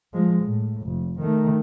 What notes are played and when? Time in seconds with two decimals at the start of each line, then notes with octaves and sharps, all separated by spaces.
0.13 F3 G#3
0.44 A2
0.82 F1
1.20 D#3 A3